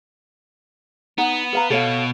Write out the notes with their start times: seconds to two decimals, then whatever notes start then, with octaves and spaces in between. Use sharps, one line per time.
1.18 B3 D#4 F#5
1.53 B4 F5 A#5
1.70 B2 A4 C#5 F5